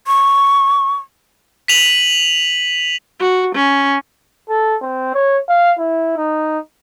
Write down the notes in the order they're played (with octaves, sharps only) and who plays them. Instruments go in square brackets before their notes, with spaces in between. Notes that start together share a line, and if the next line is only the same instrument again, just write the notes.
[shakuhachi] C#6
[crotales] B6 D#7 F7 F#7
[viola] F#4
C#4
[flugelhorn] A4
C4
C#5
F5
E4
D#4